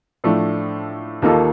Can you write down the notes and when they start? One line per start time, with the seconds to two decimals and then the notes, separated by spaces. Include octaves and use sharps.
0.24 A2 F3 A3 D4
1.22 D#2 D#3 A#3 F4 A4